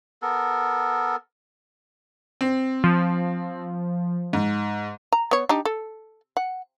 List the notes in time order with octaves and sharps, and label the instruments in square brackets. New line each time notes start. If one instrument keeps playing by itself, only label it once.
[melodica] B3 A4 A#4
[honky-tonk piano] C4
[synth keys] F3
[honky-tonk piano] G#2
[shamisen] A#5
B3 C#5
D4 D#4 G4
A4
F#5